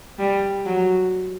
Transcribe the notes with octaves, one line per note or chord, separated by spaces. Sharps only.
G3
F#3